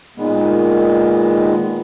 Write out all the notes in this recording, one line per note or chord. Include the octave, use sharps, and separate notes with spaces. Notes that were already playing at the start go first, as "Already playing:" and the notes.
A#2 D#3 G#3 B3